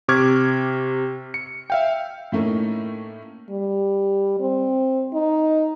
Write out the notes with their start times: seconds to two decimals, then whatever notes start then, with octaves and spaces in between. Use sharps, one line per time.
0.08 C3 C#6 D6 F6 G#6
1.34 C#7
1.70 E5 F5 G5
2.32 A2 A3 A#3 C#4 D#4
3.50 G3
4.40 C4
5.13 D#4